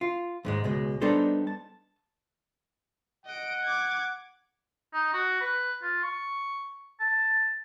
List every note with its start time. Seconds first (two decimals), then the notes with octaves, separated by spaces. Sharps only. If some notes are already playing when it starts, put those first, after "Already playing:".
0.01 F4
0.45 D#2 G#2 G#3
0.64 C#2 B2 G#3
1.01 G3 B3 D4 D#4 A4 C5
1.47 A5
3.26 D#5 F#5 D7
3.63 D6 G#6
4.94 D#4
5.13 F#4
5.41 B4
5.82 F4
6.03 C#6
7.00 A5